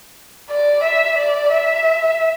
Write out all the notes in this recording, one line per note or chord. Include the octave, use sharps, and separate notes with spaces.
D5
E5
D5
E5